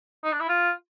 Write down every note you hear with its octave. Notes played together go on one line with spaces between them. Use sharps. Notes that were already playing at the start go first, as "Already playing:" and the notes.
D#4
D4
E4
F4